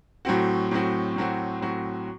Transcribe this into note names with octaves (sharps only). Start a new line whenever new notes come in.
A2 F#3 C4 F#4
A2 F#3 C4 F#4
A2 F#3 C4 F#4
A2 F#3 C4 F#4